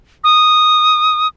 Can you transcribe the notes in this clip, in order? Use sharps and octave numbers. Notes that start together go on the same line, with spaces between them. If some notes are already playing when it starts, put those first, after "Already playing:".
D#6